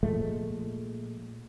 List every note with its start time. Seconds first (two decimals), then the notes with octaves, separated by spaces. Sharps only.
0.03 A#2 F3 G#3 A3